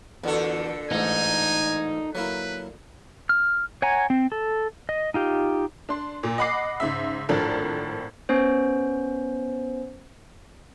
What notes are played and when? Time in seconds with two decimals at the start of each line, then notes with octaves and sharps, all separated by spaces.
0.24 E2 A#2 D3 F#4 A4
0.91 A1 G#2 D#4 G#5
2.15 F#3 A#3 E4 B4
3.29 F6
3.82 C#5 F#5 G#5 A#5
4.10 C4
4.32 A4
4.89 D#5
5.14 D#4 F4 G4
5.89 D4 C6
6.23 A#2
6.38 D#5 F#5 B5 D6 C7
6.80 G#2 C#3 E5
7.29 G#1 A2 F3 D4 A4 A#4
8.29 B3 C#4 C5